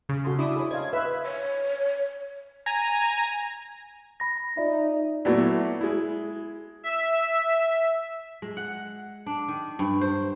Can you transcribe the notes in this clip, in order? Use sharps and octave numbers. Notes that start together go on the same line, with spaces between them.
C#3
F#4 A4 C6
D4 E4 D6 D#6
G#4 C#5
C5 D#5 F5 G#6
B4 E5 F5
C#5
G#5 A#5
B5 A#6
D#4 F4 D5 E5
A#2 F#3 A3 B3 E4 F#4
G#3 E4
E5
G#3
F#5
D4
D#3
G2
C5